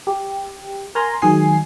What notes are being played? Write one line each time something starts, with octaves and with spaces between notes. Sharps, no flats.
G4
A#4 G#5 A#5 C6
D#3 F#3 G#3 G#4 G#5 C7